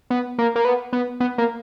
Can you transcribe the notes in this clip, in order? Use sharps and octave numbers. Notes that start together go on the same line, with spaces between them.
B3
A#3
A#3
B3
B3
B3
A#3